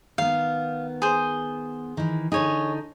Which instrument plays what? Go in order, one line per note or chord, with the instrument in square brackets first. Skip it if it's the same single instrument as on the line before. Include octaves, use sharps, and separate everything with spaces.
[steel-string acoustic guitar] D#3 B3 [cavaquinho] F5
[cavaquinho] G#4 C5
[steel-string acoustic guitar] D#3 E3
[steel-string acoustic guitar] D3 D#4 [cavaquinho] G#4 C#5